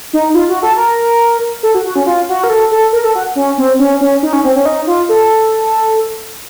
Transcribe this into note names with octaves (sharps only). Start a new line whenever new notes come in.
D#4
F4
F#4
A4
A#4
A4
F#4
F#4
C#4
F4
F#4
A#4
A4
A4
A#4
A4
F#4
C#4
C4
C#4
C#4
D#4
C#4
C4
C#4
D#4
F4
A4